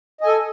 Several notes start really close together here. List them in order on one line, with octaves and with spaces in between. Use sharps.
D#5 G#5 A4